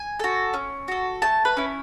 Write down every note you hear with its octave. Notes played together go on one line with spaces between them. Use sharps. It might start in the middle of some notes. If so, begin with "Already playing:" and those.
Already playing: G#5
F#4 A4
C#4
F#4 A4
A3 A5
B4
C#4 E4